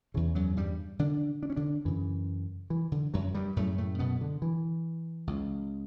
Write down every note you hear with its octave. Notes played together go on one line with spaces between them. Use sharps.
E2 C#3 E3
F#2 F#3
G2 G3
D3 D4
D4
C#4
D3 D4
F#2 C#3 E3
E3
D3
F#2 F#3
G2 G3
F#2 A2 C#3 A3
A2 A3
B2 B3
D3
E3
C#2 C#3